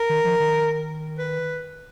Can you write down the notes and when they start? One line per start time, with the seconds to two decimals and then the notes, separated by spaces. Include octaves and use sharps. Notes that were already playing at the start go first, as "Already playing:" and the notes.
Already playing: A#4
0.09 D#3
0.25 F3
0.40 D#3
1.18 B4